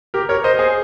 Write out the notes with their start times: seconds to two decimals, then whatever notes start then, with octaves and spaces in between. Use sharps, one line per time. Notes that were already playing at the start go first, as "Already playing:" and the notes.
0.14 G4 A#4
0.29 A#4 C#5
0.44 C5 D#5
0.59 G#4 C5